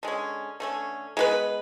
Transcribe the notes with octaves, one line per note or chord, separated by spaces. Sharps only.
D3 G#3 C#4
D3 A3 C#4
G#3 B3 F#4 B4